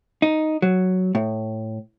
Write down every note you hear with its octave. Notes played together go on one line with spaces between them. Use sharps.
D#4
F#3
A2